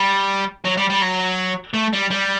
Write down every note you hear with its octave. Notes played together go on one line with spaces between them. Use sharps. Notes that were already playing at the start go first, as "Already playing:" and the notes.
Already playing: G3
F#3
G3
G3
F#3
A3
G3
G3